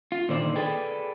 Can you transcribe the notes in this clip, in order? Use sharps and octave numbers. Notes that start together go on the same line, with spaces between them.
F4
A#2 D3 D#3 C5 D5
G#4 A4 B4 D5 G5